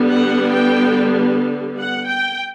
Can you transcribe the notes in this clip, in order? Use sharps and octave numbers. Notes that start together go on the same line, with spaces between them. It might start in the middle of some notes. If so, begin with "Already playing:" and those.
Already playing: D3 G3 B3
F#5
G5
F#5
G5